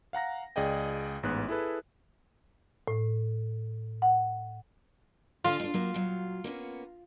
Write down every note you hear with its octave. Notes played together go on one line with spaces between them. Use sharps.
F5 F#5 A#5 A#6
C#2 G#4 D5 D#5 G5
A1 G#2 B3 F#6
E4 G#4 A4 B4
A2
F#5
D3 F4 F5 G#5
D4 D#4
F#3 A#3
A#2 F#3
A#3 B3 C#4